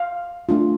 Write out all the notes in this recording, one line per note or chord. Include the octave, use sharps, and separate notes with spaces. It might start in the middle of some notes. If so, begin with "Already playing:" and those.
Already playing: F5
A3 D4 F4